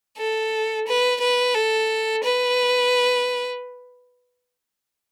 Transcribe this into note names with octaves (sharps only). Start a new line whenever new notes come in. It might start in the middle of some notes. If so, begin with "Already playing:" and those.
A4
B4
B4
A4
B4